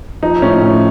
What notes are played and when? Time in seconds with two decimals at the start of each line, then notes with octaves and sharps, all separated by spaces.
0.23 F3 D#4
0.42 A2 C#4
0.61 A2